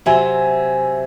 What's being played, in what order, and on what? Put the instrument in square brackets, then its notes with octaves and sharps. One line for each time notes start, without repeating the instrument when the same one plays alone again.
[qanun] C3 F#3 C4 [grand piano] E5 G#5